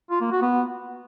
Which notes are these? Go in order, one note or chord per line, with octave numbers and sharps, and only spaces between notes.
F4
A#3
F#4
B3